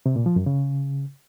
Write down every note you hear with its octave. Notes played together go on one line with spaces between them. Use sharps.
C3
A#2
F3
F#2
C#3